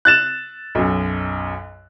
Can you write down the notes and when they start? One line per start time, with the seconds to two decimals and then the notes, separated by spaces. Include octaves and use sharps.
0.05 F#6 A6 E7
0.75 B1 F#2